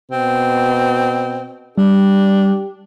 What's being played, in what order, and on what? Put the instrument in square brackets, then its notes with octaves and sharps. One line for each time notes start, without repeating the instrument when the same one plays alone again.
[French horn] B2 [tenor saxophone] C4
[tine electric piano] G3 [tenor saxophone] D4 [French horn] G4